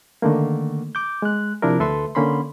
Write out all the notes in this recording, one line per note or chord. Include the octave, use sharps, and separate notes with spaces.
D3 D#3 A3 A#3
D6 G6
G#3 F#6
C3 F3 D4 E4 A#4
D2 A4 B4 E5 C6
D3 A#3 C#4 B5 C6